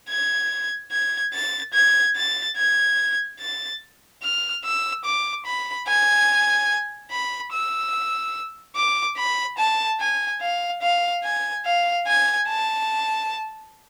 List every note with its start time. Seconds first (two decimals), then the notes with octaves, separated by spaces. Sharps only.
0.09 G#6
0.91 G#6
1.34 A6
1.74 G#6
2.16 A6
2.57 G#6
3.40 A6
4.23 F6
4.64 E6
5.05 D6
5.45 B5
5.88 G#5
7.12 B5
7.52 E6
8.76 D6
9.17 B5
9.58 A5
10.00 G#5
10.41 F5
10.82 F5
11.24 G#5
11.66 F5
12.07 G#5
12.48 A5